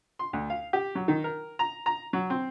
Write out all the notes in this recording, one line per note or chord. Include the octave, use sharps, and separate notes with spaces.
C6
D2
F5
G4
F#3
D#3
A#4
A#5
A#5
F#3
C4